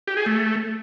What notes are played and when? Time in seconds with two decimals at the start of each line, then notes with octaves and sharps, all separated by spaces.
0.08 G4
0.17 G#4
0.26 A3